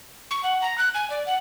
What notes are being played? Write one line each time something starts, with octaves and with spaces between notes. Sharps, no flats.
C#6
F#5
A#5
F#6
G#5
D5
F#5